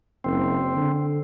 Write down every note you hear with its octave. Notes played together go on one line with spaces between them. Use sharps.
F#1 C4
D3